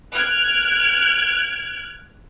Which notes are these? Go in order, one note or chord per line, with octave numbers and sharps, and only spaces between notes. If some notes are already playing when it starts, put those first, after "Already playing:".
F6 F#6 G#6 D7